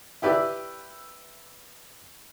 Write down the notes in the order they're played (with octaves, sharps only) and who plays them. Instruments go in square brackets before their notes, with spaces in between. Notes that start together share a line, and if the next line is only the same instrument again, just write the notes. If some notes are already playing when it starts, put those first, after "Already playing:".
[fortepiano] E4 G4 B4 D5 E5